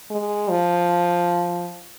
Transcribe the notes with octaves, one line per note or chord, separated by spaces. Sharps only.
G#3
F3